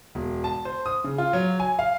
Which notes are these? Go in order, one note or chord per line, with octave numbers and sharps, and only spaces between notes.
E1
A5
C5
D#6
C#3
F4
F#3
G#5
F5